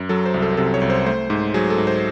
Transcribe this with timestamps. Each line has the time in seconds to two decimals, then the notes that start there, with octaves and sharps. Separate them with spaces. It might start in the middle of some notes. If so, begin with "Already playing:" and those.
Already playing: F#2
0.09 F#3 A4
0.26 C5
0.34 C2
0.42 A4
0.57 C3 A4
0.74 C#5
0.82 C2
0.90 C5
1.06 A3 C5
1.30 G#2
1.54 F#3 G#4
1.70 A4
1.78 G#2
1.87 C5